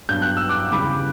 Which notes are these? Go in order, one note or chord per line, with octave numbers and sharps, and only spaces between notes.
G2 F#3 B3 D4 G6
F#6
E6
D6 F#6
E2 C#3 G3 B5 D6